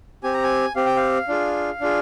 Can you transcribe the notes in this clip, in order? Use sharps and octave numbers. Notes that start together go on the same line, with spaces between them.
C4 G4 G#5
A#5
G#5
C4 G4 F5
G5
F5
D4 F4 G#4
D4 F4 G#4